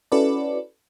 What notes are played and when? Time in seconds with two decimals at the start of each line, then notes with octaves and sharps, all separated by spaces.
0.12 C#4 E4 F#4 A4 B4 D5